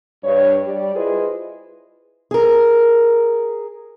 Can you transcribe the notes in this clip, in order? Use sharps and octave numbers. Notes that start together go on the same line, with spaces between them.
G2 C#5
G3 D5
E4 F4 G#4 B4 C5 D#5
G#4 A#4